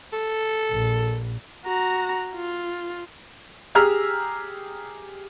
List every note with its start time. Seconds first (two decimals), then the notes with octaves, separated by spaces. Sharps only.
0.13 A4
0.72 A#1
1.65 F#4 A#5
2.35 F4
3.75 G4 G#4 A#5 E6 F6